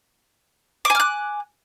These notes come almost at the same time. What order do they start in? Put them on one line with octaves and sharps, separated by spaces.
D6 G#5 F6 F#6